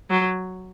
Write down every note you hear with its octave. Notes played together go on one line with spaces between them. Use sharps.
F#3